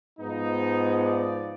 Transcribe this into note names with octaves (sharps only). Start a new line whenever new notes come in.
G#2 F3 B3 D#4
D5